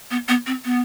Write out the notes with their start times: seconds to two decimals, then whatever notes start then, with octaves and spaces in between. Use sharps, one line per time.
0.11 B3
0.28 B3
0.46 C4
0.65 B3